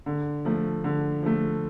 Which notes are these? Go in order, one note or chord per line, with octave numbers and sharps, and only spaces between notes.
D3
F3 A3
D3
F3 A3